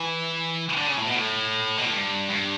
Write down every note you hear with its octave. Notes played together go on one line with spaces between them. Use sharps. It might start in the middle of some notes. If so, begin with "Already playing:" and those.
Already playing: E3
D3
C#3
A2
B2
A2
B2
A2
G2
G2